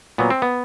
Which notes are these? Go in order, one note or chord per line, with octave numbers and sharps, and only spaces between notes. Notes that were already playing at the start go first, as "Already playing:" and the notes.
A#2 F#3 B3
C4
B3